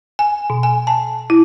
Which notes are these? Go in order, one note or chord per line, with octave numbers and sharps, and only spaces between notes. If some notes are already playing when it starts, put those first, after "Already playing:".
G#5
B2
G#5
A5
E4